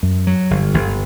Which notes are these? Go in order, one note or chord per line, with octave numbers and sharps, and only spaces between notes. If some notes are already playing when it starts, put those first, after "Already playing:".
F#2
F#3
G1
G1